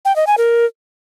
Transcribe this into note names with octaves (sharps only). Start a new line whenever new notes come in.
G5
D#5
G#5
A#4